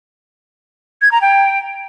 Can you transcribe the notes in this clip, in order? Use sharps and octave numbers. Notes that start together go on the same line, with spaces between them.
G#6
A#5
G5